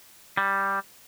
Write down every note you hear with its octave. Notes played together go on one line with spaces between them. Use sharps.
G3